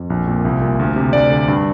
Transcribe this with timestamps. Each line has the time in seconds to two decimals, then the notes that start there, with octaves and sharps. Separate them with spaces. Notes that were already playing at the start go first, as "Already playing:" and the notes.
Already playing: F2
0.10 A#1
0.28 A#2
0.45 C2
0.62 A#2
0.79 D2
0.96 C3
1.13 D2 D5
1.31 D3
1.48 G2